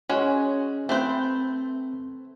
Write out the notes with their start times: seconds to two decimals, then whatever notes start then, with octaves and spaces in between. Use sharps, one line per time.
0.09 G#3 C#4 F#4 C#5
0.89 A3 C4 B4 C5